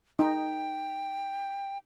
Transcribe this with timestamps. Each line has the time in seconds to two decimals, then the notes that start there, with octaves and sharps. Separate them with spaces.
0.19 D#4 G5